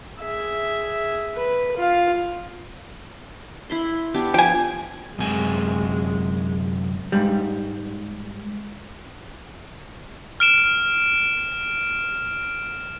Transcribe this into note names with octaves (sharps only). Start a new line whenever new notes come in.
G#4 E5
B4
F4 F5
E4 B5 C6
B3 D4 G4
F3 G5 G#5
F#2 C3 G#3 G#5
G#2 G3
F6 D7 E7